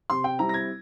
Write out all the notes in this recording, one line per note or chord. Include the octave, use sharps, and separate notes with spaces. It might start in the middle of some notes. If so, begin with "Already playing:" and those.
C3 C6
G5
G3 C4 E4 A#5
A#6
G#6